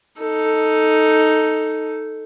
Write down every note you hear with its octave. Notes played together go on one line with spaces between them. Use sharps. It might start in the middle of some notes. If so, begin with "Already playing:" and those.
D#4 A4